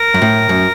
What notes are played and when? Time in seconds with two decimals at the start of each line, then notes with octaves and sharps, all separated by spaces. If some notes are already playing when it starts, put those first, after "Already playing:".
Already playing: A#4
0.14 F#2
0.22 A2
0.49 F#2